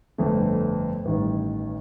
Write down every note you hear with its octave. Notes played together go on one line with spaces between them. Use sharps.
G1 F2 D3 A3
A1 G2 D#3